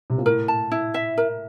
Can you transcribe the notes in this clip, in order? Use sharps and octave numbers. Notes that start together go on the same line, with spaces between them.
C3
A#2
A2 A#4
A5
E4
E5
A#4